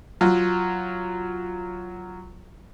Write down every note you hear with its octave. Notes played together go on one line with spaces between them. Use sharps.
F#3 F4